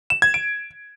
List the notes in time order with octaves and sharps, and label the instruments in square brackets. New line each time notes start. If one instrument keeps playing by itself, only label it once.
[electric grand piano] E7
G#6
D7